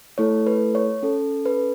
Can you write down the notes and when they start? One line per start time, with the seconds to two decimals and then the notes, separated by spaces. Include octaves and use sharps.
0.18 A3 E4 A4 C#5
0.47 B4
0.75 C#5
1.03 C#4 A4
1.45 B4